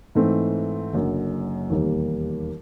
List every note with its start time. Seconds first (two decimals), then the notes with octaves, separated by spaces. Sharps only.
0.15 G#2 E3 A3 C4
0.93 F#1 F#2 D3
1.70 E1 D#2 D#3 G3 A#3